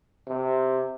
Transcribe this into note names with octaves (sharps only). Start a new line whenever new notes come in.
C3